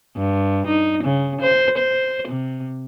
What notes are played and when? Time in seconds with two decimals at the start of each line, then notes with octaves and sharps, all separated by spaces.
0.16 G2
0.67 D#4
1.04 C#3
1.41 C5
1.78 C5
2.28 C3